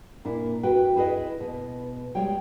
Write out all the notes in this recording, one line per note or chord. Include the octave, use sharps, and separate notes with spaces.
A#2 D4 E4
F#4 B4 G5
E4 G#4 B4 D#5
B2
G3 G#3 C#5 G5